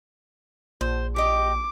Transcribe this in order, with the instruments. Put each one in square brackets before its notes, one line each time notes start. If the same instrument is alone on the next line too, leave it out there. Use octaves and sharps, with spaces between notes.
[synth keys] A#1 [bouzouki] C5
[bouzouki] G4 D#5 [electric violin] D6